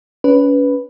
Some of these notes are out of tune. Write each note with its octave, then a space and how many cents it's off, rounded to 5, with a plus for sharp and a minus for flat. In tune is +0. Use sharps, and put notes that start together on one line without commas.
C#4 +30 B4 +0